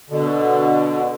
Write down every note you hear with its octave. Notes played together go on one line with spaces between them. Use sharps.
B2 D3